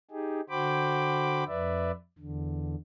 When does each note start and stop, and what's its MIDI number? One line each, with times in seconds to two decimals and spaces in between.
0.11 0.41 63
0.11 0.41 67
0.11 0.41 68
0.50 1.44 50
0.50 1.44 66
0.50 1.44 72
0.50 1.44 79
0.50 1.44 83
0.50 1.44 86
1.47 1.91 41
1.47 1.91 71
1.47 1.91 74
1.47 1.91 76
2.19 2.75 40
2.19 2.75 50